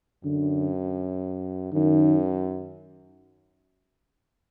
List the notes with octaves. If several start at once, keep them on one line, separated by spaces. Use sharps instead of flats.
F#2 D3
F#2 D#3